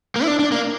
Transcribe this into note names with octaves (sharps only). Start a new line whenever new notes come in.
A#3
E4
D4
D4
A#3